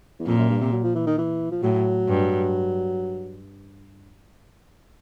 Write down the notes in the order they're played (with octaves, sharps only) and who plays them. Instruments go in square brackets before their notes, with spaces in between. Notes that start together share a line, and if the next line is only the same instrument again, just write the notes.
[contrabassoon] E2
[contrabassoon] F2 [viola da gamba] A#2
[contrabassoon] F#2
G2
C3
F#3
F3
E3
D#3
E3
F3
[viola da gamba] A2 [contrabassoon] F#3
[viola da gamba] G2